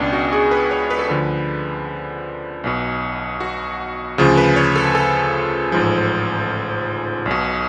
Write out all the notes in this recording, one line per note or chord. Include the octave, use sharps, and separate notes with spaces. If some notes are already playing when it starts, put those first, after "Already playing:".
Already playing: C#2 B2 B3 C#4 D4
F#4
G#4
B4
C#5
B4
A4
D2 D3 F3 B4
B1 B2
F#4
D2 C#3 F3
B4
C#5
A4
A4
A1 G#2 F3
B1
B2